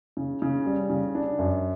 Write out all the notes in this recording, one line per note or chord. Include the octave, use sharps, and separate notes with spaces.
C#3
C#3
G3
C#3
D4
F#2